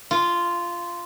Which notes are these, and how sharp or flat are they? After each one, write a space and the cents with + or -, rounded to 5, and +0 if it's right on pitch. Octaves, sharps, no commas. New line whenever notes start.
F4 -10